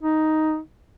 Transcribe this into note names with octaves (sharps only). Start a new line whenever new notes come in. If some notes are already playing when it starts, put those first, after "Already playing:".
D#4